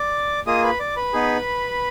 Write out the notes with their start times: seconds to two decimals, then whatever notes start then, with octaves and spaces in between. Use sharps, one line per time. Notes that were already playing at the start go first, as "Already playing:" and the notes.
Already playing: D5 D6
0.47 A#3 F4 G#4 D#5 D#6
0.63 B4 B5
0.80 D5 D6
0.96 B4 B5
1.13 B3 D#4 G#4